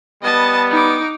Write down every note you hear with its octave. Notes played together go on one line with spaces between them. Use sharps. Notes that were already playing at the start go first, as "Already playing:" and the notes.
G3 B3 D#5 A5
D#4 D6